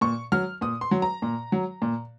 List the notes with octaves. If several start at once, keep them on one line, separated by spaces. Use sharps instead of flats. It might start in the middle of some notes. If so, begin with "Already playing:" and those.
A#2 C#6
F#3 F6
A#2 D#6
C6
F#3
A#5
A#2
F#3
A#2